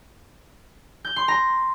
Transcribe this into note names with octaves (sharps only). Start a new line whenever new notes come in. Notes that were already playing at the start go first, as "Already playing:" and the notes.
G6
C6
A#5